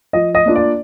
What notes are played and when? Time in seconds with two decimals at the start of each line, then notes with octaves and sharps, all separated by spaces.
0.13 F3 D#5
0.35 D#5
0.46 A#3 D4 F4
0.55 D5